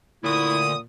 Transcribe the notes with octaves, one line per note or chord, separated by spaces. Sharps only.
D2 A#2 E4 D#6